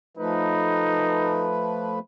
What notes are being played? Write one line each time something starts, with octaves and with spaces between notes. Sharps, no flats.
F3 A3 D#4 B4